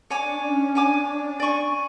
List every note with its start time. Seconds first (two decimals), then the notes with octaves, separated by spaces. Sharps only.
0.10 D4 C#5 G#5 D6
0.43 C#4
0.75 D4 C#5 G#5 D6
1.40 D5 G#5 C#6